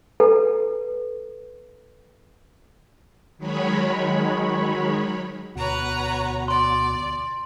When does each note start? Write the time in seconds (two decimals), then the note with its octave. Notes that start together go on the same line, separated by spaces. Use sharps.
0.20 A4 B4
3.38 D#3 F#3 G#3 C#5 B5
5.55 D2 B2 F#4 B4 C#5 A#5
6.48 D5 C6